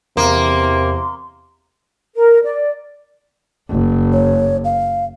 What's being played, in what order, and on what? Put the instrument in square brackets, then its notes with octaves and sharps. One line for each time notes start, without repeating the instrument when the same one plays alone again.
[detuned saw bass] E2 [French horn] C3 [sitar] A#3 [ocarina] C6
[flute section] A#4
D5
[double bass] F#1
[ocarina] C#5
F5